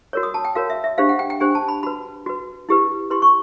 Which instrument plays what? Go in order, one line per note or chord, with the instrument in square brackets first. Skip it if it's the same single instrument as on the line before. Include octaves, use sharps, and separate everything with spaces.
[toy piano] F#4 A#4 C#5
D#6
A5
G5
F#4 A#4 C#5 F5
E5
E5
D4 G4 C5 F5
F#5
G5
G5
D4 G4 C5 G#5
A5
B5
F#4 B4 B5
F#4 B4
E4 G4 B4
E4 G4 B4 C6
C#6